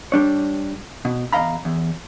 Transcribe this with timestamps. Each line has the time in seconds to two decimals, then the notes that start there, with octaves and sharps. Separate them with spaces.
0.12 G3 D4 C#5
1.05 B2
1.33 E2 G2 D#5 F5 A#5 B5
1.65 E2